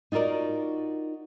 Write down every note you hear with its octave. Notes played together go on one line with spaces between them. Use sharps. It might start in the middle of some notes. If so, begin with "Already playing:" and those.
D#4 F4 F#4 A#4 D5